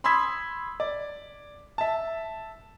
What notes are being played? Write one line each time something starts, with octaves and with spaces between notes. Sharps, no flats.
B5 C6 D#6 E6 G#6 B6
D5
E5 A5